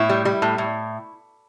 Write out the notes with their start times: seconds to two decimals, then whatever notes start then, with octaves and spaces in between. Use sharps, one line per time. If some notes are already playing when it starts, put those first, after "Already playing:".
Already playing: A2 E4
0.09 G3
0.25 G3
0.42 A2
0.58 A2